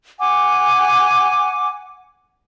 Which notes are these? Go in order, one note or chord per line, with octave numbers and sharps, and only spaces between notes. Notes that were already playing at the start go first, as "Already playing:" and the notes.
F#5 G#5 D6